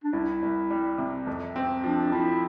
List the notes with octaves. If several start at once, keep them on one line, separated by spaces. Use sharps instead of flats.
D4
C2 E4
C2
G3
C3
F2
C4
F3 D4
F3 E4